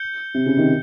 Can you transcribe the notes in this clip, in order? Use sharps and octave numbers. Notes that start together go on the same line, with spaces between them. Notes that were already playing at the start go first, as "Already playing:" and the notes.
Already playing: G6 C#7 G7
C3
C#3
C3 D#3